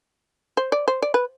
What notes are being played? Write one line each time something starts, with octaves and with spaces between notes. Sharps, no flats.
C5
D5
C5
D5
B4